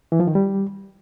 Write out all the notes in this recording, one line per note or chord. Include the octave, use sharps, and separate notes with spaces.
E3
F3
D#3
G3